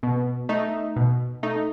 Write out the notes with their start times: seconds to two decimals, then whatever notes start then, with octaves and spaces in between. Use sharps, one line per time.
0.03 B2
0.49 A3 D#4
0.96 B2
1.43 A3 D#4